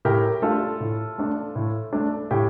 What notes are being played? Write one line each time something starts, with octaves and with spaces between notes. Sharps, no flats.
A2 G4 A#4
A3 D4 F4 A4
A2
A3 D4
A2
A3 D4
A2 G4